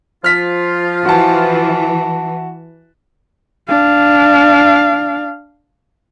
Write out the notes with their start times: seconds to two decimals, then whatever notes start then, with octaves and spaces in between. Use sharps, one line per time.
0.24 F3 F4 F6 B6
1.05 E3 F#4 A5
3.69 D4 F5